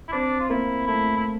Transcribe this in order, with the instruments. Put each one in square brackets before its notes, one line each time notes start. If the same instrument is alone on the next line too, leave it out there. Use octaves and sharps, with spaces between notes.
[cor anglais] E4
[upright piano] C4 [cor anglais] D4
[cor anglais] F4
[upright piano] A#3 [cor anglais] E4
[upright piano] A3 [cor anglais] E4
[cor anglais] E4